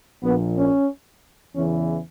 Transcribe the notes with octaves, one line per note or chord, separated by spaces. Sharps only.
A#1 A#2 B3
C#4
E2 C#3 E3 C#4